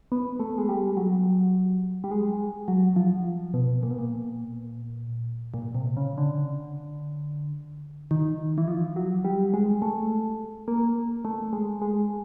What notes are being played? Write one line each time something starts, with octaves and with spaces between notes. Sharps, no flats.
B3
A3
G#3
G3
F#3
G3
G#3
F#3
F3
B2
A#2
B2
A#2
A#2
C3
C#3
D3
D#3
E3
F3
F#3
G3
G#3
A3
A#3
A3
G#3
G#3